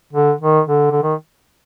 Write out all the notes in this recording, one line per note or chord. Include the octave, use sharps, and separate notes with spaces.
D3
D#3
D3
D3
D#3